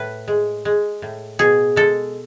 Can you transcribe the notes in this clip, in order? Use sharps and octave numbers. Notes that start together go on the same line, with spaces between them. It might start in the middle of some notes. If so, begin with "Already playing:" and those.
Already playing: A2 B4
G#3
G#3
A2
B2 G#4
G#3 A4